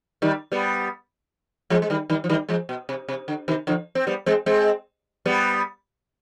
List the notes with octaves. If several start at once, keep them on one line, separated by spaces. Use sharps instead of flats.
D#3 G3
G3 B3
F3 G#3
G#3
D#3 G3
D#3 G3
F3
D#3 G3
F3 G#3
B2
C3
C3
D3
C3 D#3
D3 F3
C4
G3 B3
G#3 C4
G#3 C4
G3 B3